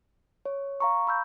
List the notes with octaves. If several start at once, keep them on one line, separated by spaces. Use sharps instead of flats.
C#5
F5 A#5 C#6
B5 E6 G6